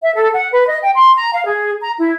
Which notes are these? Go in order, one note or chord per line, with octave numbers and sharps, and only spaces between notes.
E5
A4
F#5
B4
D#5
G5
C6
A#5
F5
G#4
A#5
E4